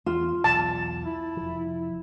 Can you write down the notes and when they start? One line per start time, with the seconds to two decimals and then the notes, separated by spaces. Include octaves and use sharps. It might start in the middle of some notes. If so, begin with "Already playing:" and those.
0.06 E2 F4
0.44 B1 E2 A5
1.05 E4
1.37 F1 F3